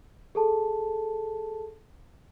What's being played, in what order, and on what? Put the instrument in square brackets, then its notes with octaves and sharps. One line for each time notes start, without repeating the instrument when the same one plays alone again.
[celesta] G#4 A4 A5